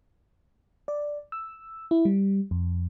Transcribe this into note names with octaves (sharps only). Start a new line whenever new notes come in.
D5
E6
E4
G3
F2